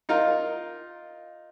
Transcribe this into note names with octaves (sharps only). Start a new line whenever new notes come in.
D#4 F4 A#4 F5